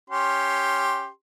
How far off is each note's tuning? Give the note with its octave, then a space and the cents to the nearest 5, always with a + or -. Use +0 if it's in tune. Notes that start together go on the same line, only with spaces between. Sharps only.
C#4 +0 G4 +0 C6 +10